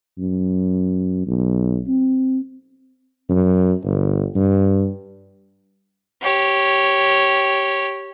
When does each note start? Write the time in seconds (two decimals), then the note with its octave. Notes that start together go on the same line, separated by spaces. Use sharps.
0.18 F#2
1.27 B1
1.87 C4
3.29 F#2
3.85 G1
4.35 G2
6.22 G4 C#5